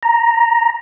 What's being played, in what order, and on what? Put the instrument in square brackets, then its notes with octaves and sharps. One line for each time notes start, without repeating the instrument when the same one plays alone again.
[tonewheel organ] A#5